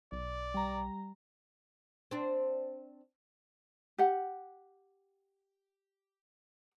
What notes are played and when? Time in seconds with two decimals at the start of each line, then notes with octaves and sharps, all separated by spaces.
0.12 B1 D5
0.54 G3 A#5
2.11 C4 D4
3.98 G4 F#5